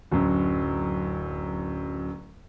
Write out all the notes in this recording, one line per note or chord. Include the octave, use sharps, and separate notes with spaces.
D1 F#2